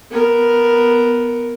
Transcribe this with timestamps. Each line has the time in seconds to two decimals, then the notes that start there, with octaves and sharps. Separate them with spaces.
0.11 B3 A#4